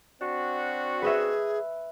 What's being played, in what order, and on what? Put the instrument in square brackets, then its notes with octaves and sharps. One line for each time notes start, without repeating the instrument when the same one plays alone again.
[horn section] C4 D4 F#4
[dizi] G#4 [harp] B4 D#5 E5